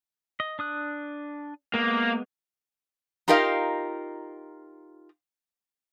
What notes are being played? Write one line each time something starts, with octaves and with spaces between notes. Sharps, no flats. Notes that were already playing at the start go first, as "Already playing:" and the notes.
D#5
D4 D#6 F#6
G#3 A#3 B3
D#4 F4 G4 A#4 D#5 F5